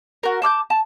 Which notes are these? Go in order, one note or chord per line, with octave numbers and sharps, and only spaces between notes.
F#4 A#4
A5 D6 F6 G6
A5